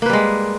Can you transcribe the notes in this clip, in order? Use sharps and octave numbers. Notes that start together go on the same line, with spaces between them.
G3 G#3 A#3 B4